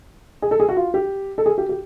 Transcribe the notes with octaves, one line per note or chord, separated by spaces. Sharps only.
G#4
A4
G#4
F#4
F4
G4
A4
G#4
G4
G4